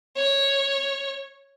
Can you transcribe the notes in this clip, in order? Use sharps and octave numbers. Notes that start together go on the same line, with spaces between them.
C#5